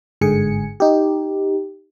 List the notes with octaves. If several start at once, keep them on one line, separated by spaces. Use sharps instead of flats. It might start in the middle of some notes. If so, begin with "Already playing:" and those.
G1 G#2 D3 G#4 G#5 C#7
D#4 G4